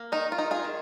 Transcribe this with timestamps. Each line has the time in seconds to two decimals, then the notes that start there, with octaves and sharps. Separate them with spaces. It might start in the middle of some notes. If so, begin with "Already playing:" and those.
Already playing: A#3
0.12 D#3 D#4
0.32 F4
0.38 D#4
0.51 F4 G#4
0.64 D#3